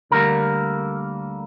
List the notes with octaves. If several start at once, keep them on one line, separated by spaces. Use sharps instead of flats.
D2 D3 G3 A#3 A#4